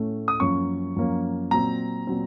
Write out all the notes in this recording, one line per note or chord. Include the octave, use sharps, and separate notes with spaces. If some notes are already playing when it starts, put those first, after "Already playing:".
Already playing: A2 A3 C#4
D#6
F#2 F3 A#3 C#4 C#6
F#2 F3 A#3 C#4
A#2 F#3 C4 A#5
A#2 F#3 C4